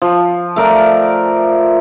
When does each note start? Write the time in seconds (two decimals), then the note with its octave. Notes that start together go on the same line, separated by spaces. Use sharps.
0.02 F3
0.56 A3 A#4 D5